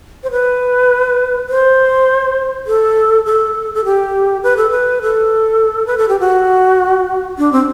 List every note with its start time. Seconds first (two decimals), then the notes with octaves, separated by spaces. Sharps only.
0.24 C5
0.31 B4
1.49 C5
2.67 A4
3.26 A4
3.75 A4
3.85 G4
4.43 B4
4.57 A4
4.71 B4
5.02 A4
5.87 B4
5.98 A4
6.09 G4
6.20 F#4
7.38 D4
7.52 C4